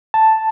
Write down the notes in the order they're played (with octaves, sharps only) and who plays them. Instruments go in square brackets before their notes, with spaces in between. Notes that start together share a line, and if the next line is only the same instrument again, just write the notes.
[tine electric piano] A5